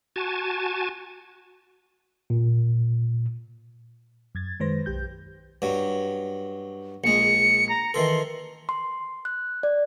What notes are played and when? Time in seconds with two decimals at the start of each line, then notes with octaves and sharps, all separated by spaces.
0.16 F#4 G#5 A5
2.30 A#2
4.35 F#2 G#6 A6
4.60 F#2 D#3 G#3 B4 C5 A#6
4.86 B1 G4 G6
5.62 G2 F#3
7.04 A#1 G#3 C#7
7.69 A#5
7.94 D#3 E3 A4 C6
8.69 C6
9.25 F#6
9.63 D5